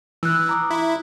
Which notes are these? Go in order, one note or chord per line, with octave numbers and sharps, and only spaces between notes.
E3 E6 F#6
A#5 D6 D#6
E4